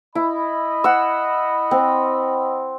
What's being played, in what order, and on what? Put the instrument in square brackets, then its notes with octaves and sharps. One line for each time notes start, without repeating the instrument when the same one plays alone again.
[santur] E4 [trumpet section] D#5 B5
[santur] F#5 E6
C4